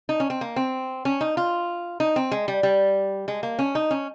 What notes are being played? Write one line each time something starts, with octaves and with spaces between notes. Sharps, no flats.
D#4
C#4
C4
A#3
C4
C#4
D#4
F4
D#4
C4
G#3
G3
G3
G#3
A#3
C#4
D#4
C#4